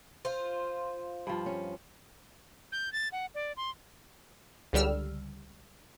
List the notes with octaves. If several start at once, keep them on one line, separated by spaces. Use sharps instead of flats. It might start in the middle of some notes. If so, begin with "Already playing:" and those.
F4 C5
G2 F3
C#4
G6
A6
F#5
D5
C6
C#2 D3 G3 E6 F6